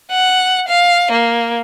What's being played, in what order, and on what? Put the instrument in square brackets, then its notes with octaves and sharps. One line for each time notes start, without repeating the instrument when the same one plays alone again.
[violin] F#5
F5
A#3